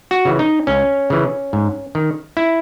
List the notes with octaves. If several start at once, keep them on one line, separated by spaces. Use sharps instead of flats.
F#4
C#3 E3
D#4
C#2 C#4
C#3 E3
G#2
D#3
E4